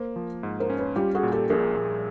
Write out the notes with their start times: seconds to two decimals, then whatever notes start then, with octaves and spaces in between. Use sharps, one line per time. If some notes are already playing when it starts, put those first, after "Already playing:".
Already playing: A#3 A#4 C5
0.16 F3
0.43 G#2
0.60 A#4 C5
0.70 C#4
0.78 B4 C#5
0.96 G3 F4 G4
1.15 F#4 G#4
1.23 A#2
1.32 G4 A4
1.49 A#1 G#4 A#4
1.77 A#1